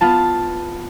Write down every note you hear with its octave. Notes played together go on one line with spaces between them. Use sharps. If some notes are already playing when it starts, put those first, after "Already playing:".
B3 F4 A5